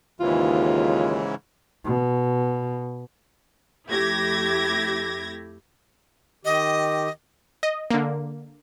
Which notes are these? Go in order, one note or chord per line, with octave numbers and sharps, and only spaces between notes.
D#2 G#2 C#3 E3 F4
B2
F2 A3 E4 G4 G#6 A#6
D#3 G4 D#5
D#5
D3 A#3